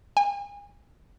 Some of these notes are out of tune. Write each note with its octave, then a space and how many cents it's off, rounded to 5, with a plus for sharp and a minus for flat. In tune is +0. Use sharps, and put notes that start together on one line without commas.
G#5 -35